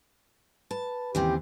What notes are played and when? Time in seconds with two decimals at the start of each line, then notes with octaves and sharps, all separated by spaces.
0.71 B4 A5
1.15 D#2 C#3 E3 C4 G4